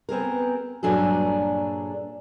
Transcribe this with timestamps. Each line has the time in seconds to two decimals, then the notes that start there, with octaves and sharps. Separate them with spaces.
0.09 B3 C4 G#4 A#4
0.83 G2 A#2 F#3 D4 G#4 A4